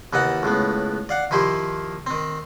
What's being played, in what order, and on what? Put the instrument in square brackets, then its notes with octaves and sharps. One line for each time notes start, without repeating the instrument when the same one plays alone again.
[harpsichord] D#2 E3 D#4 F#5 A5
C#2 A2 B3
D5 F5 F#5
D#3 F3 E4 G4 C5
D#3 C4